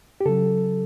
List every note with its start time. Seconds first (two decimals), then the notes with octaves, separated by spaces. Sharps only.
0.21 G4
0.26 C#3 F#3 A4